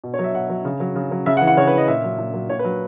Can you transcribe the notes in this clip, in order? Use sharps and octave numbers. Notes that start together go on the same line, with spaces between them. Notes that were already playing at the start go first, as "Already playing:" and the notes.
B2
C#5
F#3
E5
B2 F#5
F#3
C#3
F#3
C#3
F#3
C#3 E5
F#5
E3
F#5
C#3 C#5
B4
E3 D#5
A#2 E5
F#3
A#2
F#3
A#2 C#5
B4
F#3